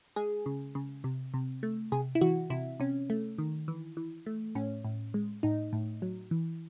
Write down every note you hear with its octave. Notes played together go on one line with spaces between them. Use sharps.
G#3 G#4
C#3
C#3
C3
C3
A3
C3 G#4
E4
E3 F#4
C3 E4
C3 C#4
A3
D#3
E3
E3
A3
A2 C#4
A2
G#3
A2 D#4
A2
F#3
E3